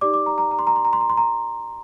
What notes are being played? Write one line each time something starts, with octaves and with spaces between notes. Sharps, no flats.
D#4 G4 D5 D6
D6
A#5
A#5
A#5
C6
A#5
C6
A#5
C6
A#5
C6
A#5